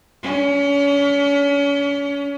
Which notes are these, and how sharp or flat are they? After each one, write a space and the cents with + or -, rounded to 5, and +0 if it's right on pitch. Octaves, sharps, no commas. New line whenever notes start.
C#4 +35